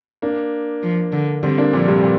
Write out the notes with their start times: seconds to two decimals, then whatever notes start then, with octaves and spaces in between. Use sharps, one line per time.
0.22 A#3 D4
0.83 F3
1.13 D3
1.43 D3 G3 C4
1.58 A#3 D4
1.73 A#2 D3 F3
1.88 G2 C3
2.04 A#2